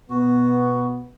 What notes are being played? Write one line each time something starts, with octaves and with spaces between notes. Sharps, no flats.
B2 B3 F#4